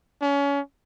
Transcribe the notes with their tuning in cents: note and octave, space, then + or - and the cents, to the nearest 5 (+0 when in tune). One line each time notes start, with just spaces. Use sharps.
C#4 +30